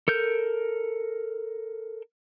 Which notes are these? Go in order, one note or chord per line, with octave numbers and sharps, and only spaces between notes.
A4 A#4 G6